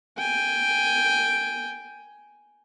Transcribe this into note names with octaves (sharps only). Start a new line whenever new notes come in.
G5 G#5